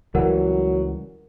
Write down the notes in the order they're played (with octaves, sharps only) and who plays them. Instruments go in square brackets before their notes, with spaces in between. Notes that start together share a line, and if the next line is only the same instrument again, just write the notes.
[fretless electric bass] C#2 E3 G3 [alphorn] F#3 [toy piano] A#4 F#5